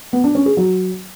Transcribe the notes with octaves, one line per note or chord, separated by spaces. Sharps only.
B3
D4
C#4
G#4
F#3